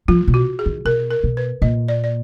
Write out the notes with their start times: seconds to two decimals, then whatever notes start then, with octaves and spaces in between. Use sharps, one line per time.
0.08 F3 F4
0.28 B2
0.34 F#4
0.59 G#4
0.66 D#3
0.85 B2 A#4
1.11 A#4
1.24 B2
1.37 B4
1.62 A#2 D#5
1.88 D5
2.04 D5